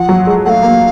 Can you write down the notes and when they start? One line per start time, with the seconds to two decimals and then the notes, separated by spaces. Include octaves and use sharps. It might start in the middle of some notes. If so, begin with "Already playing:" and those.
Already playing: F3 F#5
0.09 F#3
0.27 G#3
0.45 A3 F5 F#5
0.63 A#3